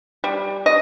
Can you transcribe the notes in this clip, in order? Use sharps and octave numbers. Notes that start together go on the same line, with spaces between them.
G3
D#5